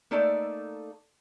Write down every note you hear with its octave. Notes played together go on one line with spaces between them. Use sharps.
A3 A#3 D#4 A4 D5 E5